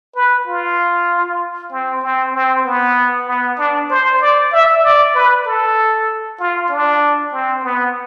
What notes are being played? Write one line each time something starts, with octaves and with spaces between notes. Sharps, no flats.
B4
F4
C4
C4
C4
B3
B3
D4
C5
D5
E5
D5
B4
A4
F4
D4
C4
B3